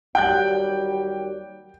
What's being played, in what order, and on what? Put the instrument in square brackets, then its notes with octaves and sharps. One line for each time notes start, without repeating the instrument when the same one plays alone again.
[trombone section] D#2 F#3 G3 [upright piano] G5 F#6 G6